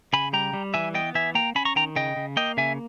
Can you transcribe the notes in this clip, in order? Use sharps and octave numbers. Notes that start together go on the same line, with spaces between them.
C#3 G#5 B5
G3 G5 A#5
G3
E3 E5 G#5
B3 D#5 G5
E3 E5 G#5
A#3 G5 A#5
C#4 G#5 B5
A#5 C#6
D#3 G5 A#5
C#3 D#5 G5
C#3
A#3 D#5 G5
C#3 E5 G#5